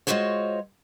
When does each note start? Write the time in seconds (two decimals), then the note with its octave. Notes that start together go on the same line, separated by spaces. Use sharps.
0.07 G#3 B3 F4 F#4 C5 C#5